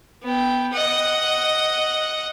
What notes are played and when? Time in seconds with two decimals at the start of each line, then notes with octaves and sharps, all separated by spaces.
0.22 B3 G5
0.73 D#5 F#5